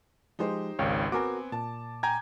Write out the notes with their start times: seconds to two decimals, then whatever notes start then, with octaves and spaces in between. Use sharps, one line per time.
0.39 F3 G#3 D#4 G4 C5
0.79 G#1 C#2 C#5 F5 G5
1.12 B3 C4 F#4 A#4 G#5 D6
1.52 A#2 A5
2.03 G5 G#5 A#5 G6 G#6